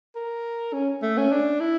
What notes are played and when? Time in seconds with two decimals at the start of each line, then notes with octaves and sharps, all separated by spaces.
0.15 A#4
0.73 C#4
1.02 A3
1.17 C#4
1.32 D4
1.60 E4